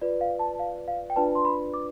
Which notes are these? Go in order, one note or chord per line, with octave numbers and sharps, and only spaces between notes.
F4 B4 D5
F5
A5
F5
F5
G5
D4 F4 B4 D5 A5
C6
B5
D6